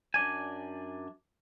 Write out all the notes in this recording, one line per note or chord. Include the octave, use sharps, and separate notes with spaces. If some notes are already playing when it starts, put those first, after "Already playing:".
F#2 D4 D5 G#5